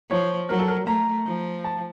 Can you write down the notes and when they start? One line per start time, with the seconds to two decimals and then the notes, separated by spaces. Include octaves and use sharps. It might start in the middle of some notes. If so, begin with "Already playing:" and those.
0.10 F3 C#5
0.49 F#3 A#4
0.59 A4
0.68 A#4
0.87 A3 A#5
1.26 F3
1.64 A5